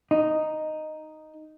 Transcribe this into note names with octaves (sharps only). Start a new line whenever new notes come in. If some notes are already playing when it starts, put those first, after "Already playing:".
D#4